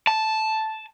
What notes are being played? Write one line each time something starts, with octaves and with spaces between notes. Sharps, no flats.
A5